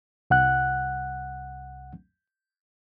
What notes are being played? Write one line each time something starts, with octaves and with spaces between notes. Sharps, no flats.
C2 F#5 F#6